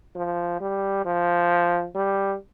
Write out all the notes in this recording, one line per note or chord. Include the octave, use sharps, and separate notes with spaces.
F3
G3
F3
G3